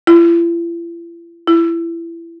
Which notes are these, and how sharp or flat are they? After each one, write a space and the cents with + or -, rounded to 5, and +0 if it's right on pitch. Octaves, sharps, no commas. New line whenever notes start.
E4 +45
E4 +25